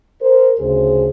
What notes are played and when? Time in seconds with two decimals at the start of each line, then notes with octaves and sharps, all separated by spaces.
0.21 A#4 C5
0.59 D2 C#3 G#4 C5